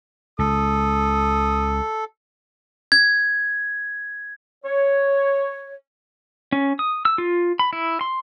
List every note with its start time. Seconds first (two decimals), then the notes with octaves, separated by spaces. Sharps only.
0.39 C#2 A4 D#6
2.92 G#6
4.64 C#5
6.52 C#4
6.79 D#6
7.05 E6
7.18 F4
7.59 B5
7.73 E4
8.01 C6